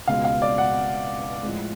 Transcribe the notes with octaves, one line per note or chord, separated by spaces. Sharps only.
C#2 B2 G#3 F5
F5
D5
F#5
A2 F3 G#3